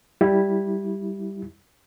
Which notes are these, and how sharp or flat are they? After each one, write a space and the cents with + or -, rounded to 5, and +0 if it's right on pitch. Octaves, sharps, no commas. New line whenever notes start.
G3 +0 E4 +0